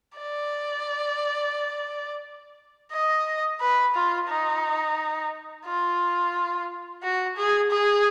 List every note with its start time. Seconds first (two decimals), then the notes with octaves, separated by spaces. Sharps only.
0.18 D5
2.92 D#5
3.60 B4
3.94 F4
4.28 D#4
5.65 F4
7.02 F#4
7.37 G#4
7.71 G#4